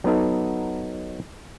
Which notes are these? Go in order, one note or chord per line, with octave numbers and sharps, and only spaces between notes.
F#3 B3 D#4 A4